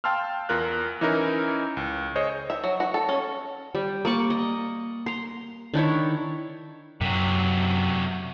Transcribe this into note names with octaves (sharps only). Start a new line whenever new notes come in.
F5 G5 A5 C6 E6 F6
E2 F4 A#4 F#6
E3 C#4 D#4 E4 A#4
C#2
G#4 C5 C#5 D#5
E5
F#3
F#4
A4
C#4
G3
A#3 D5 C#6
D#5
A#5 C6
D#3 D4 E4 C#5
F#2 C3 F#3